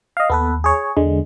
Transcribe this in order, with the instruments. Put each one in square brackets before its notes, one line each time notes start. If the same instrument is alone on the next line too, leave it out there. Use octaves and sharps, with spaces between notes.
[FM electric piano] D#5 F5
[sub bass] D#2 [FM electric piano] B3 A4 B4
[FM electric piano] G#4 C#5
[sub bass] E2 [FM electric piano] D3 G#3